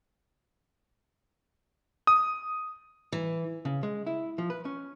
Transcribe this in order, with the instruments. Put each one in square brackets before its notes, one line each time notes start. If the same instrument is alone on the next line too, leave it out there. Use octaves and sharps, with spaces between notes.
[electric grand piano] D#6
[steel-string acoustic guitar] E3
[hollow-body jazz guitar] C#3
G#3
E4
F3
B4
C#4